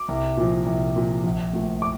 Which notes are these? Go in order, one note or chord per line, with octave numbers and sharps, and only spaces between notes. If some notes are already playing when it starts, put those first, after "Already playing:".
Already playing: D6
C2
A#2 F3
C2
A#2 F3
A#1
A#2 A3
D6